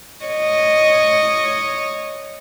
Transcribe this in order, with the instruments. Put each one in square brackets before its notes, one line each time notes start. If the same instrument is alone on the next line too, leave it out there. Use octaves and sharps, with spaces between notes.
[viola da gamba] C#5 D#5